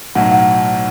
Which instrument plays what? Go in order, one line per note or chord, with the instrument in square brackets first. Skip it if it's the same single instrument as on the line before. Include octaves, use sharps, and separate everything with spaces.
[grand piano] B1 A2 F#3 [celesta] F#5
[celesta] F#5